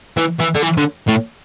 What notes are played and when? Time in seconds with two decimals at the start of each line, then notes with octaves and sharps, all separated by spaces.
0.17 E3
0.40 E3
0.55 D3
0.63 E3
0.78 D3
1.08 A2